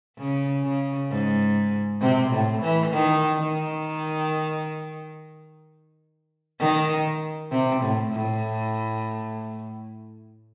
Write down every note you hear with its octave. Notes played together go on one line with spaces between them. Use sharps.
C#3
C#3
G#2
C3
A2
E3
D#3
D#3
D#3
C3
A2
A2